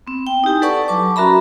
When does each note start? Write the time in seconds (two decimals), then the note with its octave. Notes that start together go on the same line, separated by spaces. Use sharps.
0.07 B3 C4
0.27 G5
0.44 D#4 E4 G4 G#5
0.62 A4 B4 D5 F#5 A5 C#6
0.88 F#3 A5 C#6 D6
1.16 C#4 F#4 A#4 E5 A#5 B5